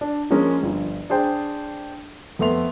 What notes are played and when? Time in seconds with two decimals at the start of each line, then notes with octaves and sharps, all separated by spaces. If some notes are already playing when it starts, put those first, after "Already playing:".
0.01 D4
0.30 F3 G#3 A#3 C#4
0.63 G1 F3
1.10 D4 G#4 C5 G5
2.39 F2 A3 B3 E5 C6 F7